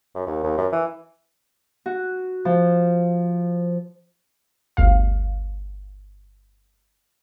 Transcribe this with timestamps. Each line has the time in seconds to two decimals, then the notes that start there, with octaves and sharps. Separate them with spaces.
0.15 F#2
0.27 D#2
0.43 D#2
0.57 F#2
0.72 E3
1.86 F#4
2.45 F3
4.77 G1 D2 F5